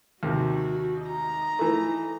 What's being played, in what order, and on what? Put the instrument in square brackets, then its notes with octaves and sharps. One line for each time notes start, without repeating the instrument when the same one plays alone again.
[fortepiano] D#2 C3 [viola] F#4
[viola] D#4 A#5
[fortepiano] E3 A3